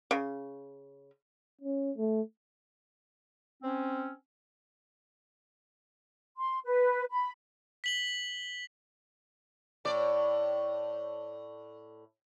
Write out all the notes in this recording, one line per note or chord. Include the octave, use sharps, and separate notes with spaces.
C#3
C#4
A3
C4 C#4
C6
B4
B5
B6 F#7 G7
A2 D5